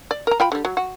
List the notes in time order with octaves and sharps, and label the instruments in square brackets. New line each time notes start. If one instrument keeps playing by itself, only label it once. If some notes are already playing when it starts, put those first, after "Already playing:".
[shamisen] D5
A#4 A#5
F4 G5 B5
D3 G3
F#3
F#4